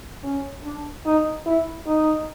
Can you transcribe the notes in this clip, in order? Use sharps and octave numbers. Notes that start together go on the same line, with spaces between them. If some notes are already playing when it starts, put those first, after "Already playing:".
C#4
D4
D#4
E4
D#4